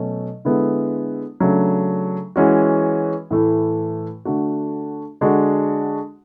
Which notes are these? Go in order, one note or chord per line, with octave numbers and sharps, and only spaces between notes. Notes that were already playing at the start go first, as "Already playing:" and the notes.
Already playing: B2 F#3 A3 C#4
D3 G#3 B3 E4
C#3 F#3 A3 D4
E3 G#3 C#4 F#4
A2 E3 A3 E4
D3 A3 D4 F#4
D3 G#3 D4 F#4